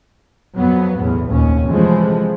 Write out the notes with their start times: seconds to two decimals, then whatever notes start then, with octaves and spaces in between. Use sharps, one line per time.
0.56 F2 F#3 B3
0.99 B1 E2 A2
1.29 F1 D#2 A#2 C#4
1.67 C3 E3 F3 G#3 A3